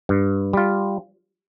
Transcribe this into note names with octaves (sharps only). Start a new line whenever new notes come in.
G2
G3 F4